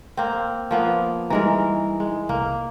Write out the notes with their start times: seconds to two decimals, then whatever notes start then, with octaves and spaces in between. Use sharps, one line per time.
0.17 A#3 C4
0.71 F3 A#3 B3
1.30 E3 G3 G#3 D#4 A#4 A#5
2.00 G#3
2.29 C2 A#3